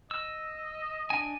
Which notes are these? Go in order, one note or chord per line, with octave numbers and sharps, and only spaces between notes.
D#5 E6
D4 G#5